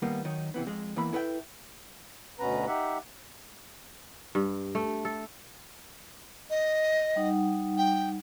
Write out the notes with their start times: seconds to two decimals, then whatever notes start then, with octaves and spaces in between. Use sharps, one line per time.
0.02 D#3 G3 A#3 B3
0.25 D#3 F#3 D#4
0.54 C3 E3 B3
0.67 F2 G#3
0.96 E2 E3 A#3 B5
1.13 E4 A4 B4 E5 F#5 G5
2.39 D2 B2 B3 C#4 B4 A#5
2.67 D#4 G4 E5 F#5
4.35 G2
4.75 A3
5.05 A4
6.50 D#5
7.16 G3 D#4 F#5
7.78 G5